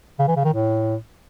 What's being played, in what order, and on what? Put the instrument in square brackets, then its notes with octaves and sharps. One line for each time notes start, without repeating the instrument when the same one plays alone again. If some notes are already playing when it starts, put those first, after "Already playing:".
[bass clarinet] C#3
E3
C#3
D#3
A2